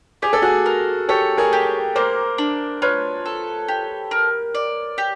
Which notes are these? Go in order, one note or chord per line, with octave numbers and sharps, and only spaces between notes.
G4 G#4
A4
F#4 G#4
A#4
G4 A4 C#5
G#4 A#4
G4
A#3 A#4 C5
D4
F4 B4 C#5
A4
G4
A#4
D5
G4